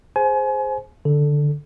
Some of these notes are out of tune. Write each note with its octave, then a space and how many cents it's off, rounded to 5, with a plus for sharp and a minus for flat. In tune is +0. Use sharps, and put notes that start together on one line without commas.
G#4 +0 C5 +0 G#5 +30
D3 +0 A4 +0